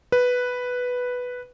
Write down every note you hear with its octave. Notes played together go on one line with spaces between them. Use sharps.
B4